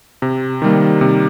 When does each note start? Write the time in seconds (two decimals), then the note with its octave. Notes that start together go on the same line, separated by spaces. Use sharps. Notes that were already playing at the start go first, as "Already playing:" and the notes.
0.22 C3
0.62 D#3 G3 A#3
1.01 C3